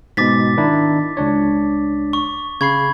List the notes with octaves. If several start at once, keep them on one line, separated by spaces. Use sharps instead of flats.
G#2 B2 D6 A6 B6
D#3 D4 E4
C#2 D4 C#5
C#6
C#3 B5 C#6 G#6 C7